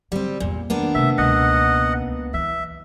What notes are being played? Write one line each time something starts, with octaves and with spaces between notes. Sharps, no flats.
D3 G3 C4
E2 A#2 A#3
D#3 A#3 B3 D4
C3 A3 E5
C#2 B2 D#5 F#5
E3 E5